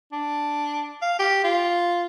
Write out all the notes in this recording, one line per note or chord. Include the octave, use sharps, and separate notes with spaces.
D4
F5
G4
F4